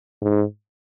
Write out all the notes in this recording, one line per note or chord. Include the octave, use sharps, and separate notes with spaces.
G#2